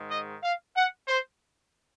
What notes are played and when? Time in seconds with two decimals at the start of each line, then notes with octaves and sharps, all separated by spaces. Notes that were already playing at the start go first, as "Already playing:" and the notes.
Already playing: G#2 D#3 G#3
0.09 D#5
0.42 F5
0.75 F#5
1.08 C5